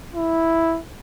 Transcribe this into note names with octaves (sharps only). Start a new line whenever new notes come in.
E4